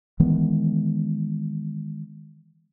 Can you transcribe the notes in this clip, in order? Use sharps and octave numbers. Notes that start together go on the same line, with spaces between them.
D#3 E3 G#3 B3